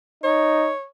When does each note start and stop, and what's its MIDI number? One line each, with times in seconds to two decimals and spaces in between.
0.24 0.71 63
0.24 0.84 73